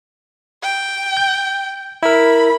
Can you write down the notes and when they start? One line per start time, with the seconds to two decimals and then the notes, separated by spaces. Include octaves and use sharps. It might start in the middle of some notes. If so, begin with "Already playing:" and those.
0.62 G5
1.17 G6
2.03 E4 A#4 B5